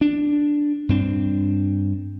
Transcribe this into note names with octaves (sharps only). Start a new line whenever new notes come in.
D4
G2 C4 D4